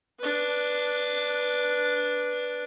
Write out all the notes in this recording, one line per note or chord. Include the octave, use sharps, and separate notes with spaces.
D4 B4